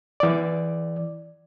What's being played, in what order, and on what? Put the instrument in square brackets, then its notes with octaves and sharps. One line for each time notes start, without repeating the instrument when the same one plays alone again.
[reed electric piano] E3 D5